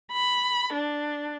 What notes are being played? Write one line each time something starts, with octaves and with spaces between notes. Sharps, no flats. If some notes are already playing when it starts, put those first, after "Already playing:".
B5
D4